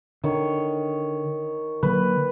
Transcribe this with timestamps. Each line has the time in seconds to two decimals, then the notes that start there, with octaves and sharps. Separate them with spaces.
0.24 D3 D#3 C#5
1.83 D3 F#3 A#3 B4